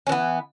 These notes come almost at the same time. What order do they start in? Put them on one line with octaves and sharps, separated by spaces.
C#4 E3 B3